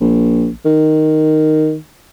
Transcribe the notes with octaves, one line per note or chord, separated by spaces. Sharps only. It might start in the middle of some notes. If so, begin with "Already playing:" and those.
A#1
D#3